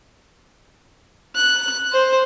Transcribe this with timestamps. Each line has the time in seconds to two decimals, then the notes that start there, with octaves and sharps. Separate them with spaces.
1.36 F#6
1.92 C5